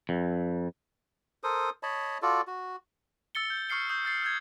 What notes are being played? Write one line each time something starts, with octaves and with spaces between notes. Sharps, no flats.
F2
A4 A#4 C5 D#6
C#5 D#5 A5 B5
F4 F#4 A4 D5
F#4
E6 A6 C#7 G7
G6
C#6 D#6 F6 C7 C#7 G7
D#6 G6
E6 A6 C7
E6 G6 G#6